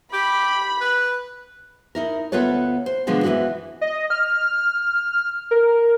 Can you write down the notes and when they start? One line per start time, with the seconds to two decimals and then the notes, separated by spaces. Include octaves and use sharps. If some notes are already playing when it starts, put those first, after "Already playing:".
0.13 G4 B5
0.81 B4
1.95 D#4 E4 A#4
2.32 D2 B3 F4 A4 B4 C#5
2.86 C5
3.07 B2 D3 F3 G#3 B3 D4
3.23 E3 F3 B3 E4 F#4
3.81 D#5
4.10 F6
5.51 A#4